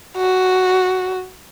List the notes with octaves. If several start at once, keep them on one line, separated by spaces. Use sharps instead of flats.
F#4